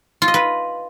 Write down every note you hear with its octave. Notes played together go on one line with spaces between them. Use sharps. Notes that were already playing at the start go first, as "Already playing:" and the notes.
F4
D#5
B4